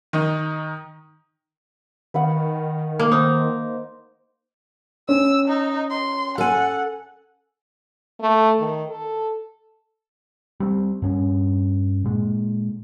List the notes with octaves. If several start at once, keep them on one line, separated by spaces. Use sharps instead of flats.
D#3 D#4
D#3 B4 F5 F#5
A#3
D#4 C5
C#4 E6
D#4
C6
A4 F#5 G#5
A3
D#3
A4
G3 C4
G2 C#4
A#2 G#3